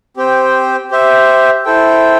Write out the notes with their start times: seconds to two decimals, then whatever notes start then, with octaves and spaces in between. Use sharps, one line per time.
0.17 C4 G4 C5 G5
0.91 G4 C5 E5
1.65 E4 A4 C5 G5